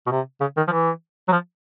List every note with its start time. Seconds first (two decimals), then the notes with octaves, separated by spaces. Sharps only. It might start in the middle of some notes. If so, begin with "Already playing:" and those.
0.06 B2
0.11 C3
0.40 C#3
0.57 D#3
0.68 F3
0.72 E3
1.28 F#3
1.32 F3